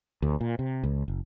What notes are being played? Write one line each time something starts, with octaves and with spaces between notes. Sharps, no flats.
D2
A#2
C3
C#2
F#1